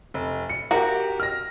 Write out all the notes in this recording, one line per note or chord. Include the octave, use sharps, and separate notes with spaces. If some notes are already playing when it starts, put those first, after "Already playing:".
F1
C#7
F#4 G4 A#4
F6 A#6